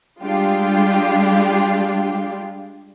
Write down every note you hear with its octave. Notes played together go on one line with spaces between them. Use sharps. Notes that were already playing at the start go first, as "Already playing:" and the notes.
G3 G#3 D4 F4 G4